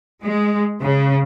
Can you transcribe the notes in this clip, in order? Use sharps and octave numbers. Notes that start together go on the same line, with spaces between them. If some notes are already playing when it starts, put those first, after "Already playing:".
G#3
C#3